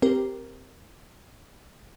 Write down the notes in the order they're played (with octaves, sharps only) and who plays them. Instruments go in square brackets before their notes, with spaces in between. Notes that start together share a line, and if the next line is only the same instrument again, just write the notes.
[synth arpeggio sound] C4 G4 A#4